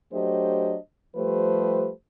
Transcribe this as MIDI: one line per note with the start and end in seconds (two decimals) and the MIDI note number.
0.13 0.76 54
0.13 0.76 57
0.13 0.76 62
0.13 0.76 67
0.13 0.76 72
0.13 0.76 75
1.15 1.90 53
1.15 1.90 55
1.15 1.90 57
1.15 1.90 67
1.15 1.90 71
1.15 1.90 72